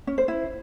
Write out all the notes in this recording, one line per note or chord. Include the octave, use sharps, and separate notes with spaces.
C#4
C5
E4